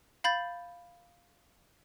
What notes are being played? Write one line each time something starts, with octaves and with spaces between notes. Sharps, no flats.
F5 B5 G6 A6